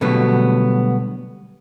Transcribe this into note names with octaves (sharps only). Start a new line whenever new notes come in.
B2 D3 F#3 G3 A3 B3